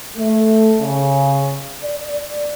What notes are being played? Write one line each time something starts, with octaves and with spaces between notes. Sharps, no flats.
A3
C#3
D5